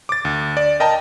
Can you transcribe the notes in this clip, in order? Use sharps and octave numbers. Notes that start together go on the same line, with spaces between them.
D6 A6
D2
D5
A#4 D#5 G5 A5 A#5